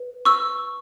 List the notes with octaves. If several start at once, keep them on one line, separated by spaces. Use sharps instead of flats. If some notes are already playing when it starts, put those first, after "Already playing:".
Already playing: B4
C#6 E6